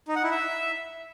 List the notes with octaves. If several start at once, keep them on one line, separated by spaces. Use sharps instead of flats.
D#4
F#5
E4
E5